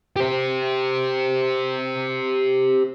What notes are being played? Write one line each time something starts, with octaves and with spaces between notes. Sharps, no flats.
G4 C5